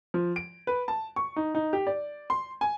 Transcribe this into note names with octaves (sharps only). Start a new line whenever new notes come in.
F3
D7
B4
A5
C#6
D#4
D#4
G4
D5
C6
G#5